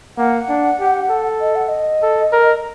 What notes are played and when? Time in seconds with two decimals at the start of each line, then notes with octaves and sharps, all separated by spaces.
0.17 A#3 F#5
0.49 D4
0.80 G4
1.10 A4
1.41 D#5
1.55 F#5
1.68 D#5
2.02 A4
2.32 A#4